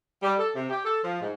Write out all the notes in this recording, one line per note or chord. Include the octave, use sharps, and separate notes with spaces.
G3
A4
C3
G4
A4
F3
G#2